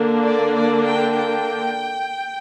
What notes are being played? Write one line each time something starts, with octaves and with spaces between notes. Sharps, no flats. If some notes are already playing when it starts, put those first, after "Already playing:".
Already playing: D3 A#3 D4
D5
D5
G5
G5